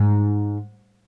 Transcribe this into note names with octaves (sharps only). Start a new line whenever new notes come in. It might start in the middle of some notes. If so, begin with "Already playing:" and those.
Already playing: G#2